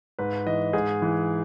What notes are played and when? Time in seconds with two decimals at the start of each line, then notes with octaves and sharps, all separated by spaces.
0.19 G#2 B4
0.47 E3 D#5
0.73 G#2 G#4
1.02 E3